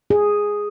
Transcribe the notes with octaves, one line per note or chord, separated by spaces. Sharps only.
G#4